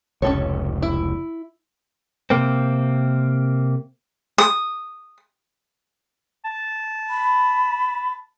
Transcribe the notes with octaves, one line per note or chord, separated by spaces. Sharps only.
F1 C#2 C#4 A4 C#5
E4
C3 A#3 C4
D#6
A5
B5